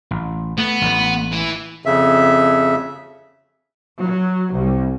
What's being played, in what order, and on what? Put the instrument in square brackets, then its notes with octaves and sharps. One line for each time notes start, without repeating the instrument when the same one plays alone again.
[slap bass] A1
[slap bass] A3 [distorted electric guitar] B3
[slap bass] A1 A3
[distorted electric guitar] E3
[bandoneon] F2 C#3 E5
[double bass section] F#3
C2